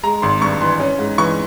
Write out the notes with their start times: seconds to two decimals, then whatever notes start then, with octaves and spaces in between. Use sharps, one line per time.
0.03 G#3 A#5
0.22 G#1 C6
0.41 G2 C#6
0.61 E3 C6
0.80 C#4
0.98 G#2
1.18 E3 C#6